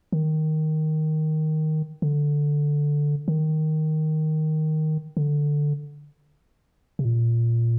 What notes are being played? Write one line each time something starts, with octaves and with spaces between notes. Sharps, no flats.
D#3
D3
D#3
D3
C3
A#2